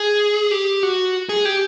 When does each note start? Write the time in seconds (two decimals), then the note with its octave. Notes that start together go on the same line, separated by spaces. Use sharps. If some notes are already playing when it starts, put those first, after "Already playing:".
Already playing: G#4
0.51 G4
0.83 F#4
1.29 G#4
1.45 G4